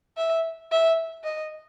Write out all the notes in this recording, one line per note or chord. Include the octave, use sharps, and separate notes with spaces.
E5
E5
D#5